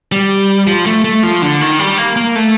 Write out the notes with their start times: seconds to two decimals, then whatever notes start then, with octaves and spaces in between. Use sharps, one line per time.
0.12 G3
0.67 F3
0.86 A3
1.04 A3
1.23 F3
1.42 D3
1.61 D#3
1.79 G3
1.98 A#3
2.16 A#3
2.35 A3